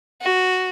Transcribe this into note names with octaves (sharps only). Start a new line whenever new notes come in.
F#4